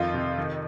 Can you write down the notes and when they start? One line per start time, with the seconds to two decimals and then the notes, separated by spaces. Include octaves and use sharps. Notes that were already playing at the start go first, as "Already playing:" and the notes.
Already playing: F2 D#3 F4
0.14 C3
0.38 D#3